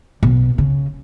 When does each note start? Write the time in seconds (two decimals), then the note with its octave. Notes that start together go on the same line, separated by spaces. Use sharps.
0.23 B1
0.58 C#3